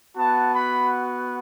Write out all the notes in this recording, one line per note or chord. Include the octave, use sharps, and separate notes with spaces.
B3 F#4 A5
B5